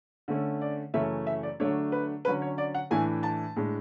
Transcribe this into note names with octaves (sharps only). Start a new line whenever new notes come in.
D3 A3 C#4
D5
F#2 C#3 E3 A3 C#4 E5
E5
D5
D3 F#3 A3 D4 C#5
B4
D3 F#3 C#4 B4
C#5
D5
F#5
A2 E3 A3 D4 G#5
A5
A2 G#3 D4